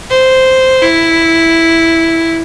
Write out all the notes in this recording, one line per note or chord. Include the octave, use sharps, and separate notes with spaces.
C5
E4